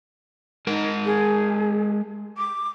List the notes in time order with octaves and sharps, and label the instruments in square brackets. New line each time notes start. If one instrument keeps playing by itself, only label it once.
[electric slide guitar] G#3 A#4 [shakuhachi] D#4
[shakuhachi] G#4
D6